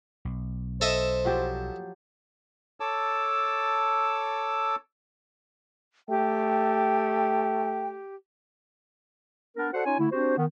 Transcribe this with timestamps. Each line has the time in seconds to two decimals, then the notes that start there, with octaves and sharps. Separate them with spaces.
0.25 B1
0.81 A4 C5 D#5 E5
1.25 F3 F#3 G4
2.80 A4 C#5 A5 D6 E6
6.09 A3 G4 G5
9.57 B3 D4 A#4
9.73 F#4 A4 C5 D5 F#5
9.84 C#4 D#4 F4 C#5 G#5
9.98 D3 A3 E4
10.11 C4 D4 F#4 G4 C5
10.37 D#3 B3